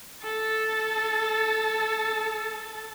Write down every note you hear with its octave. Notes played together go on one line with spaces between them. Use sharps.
A4 A6